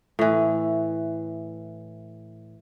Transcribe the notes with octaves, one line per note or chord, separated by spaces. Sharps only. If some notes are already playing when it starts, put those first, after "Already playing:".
A2 E3